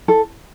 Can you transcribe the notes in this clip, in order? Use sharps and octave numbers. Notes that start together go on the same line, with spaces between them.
A4